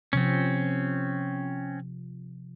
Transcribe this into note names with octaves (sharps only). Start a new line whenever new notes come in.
C3 F3 C4 C#4